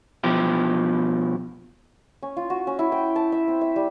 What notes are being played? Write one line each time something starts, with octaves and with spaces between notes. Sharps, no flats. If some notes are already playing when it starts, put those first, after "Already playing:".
B2 F3 E4 G4
C#4
F4
F#4
C#4
E4
G5
A5
E5
C4
E5
G3